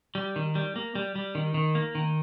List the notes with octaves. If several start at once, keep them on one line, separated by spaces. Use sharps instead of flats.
G3
D#3
G3
A#3
G3
G3
D#3
D#3
A#3
D#3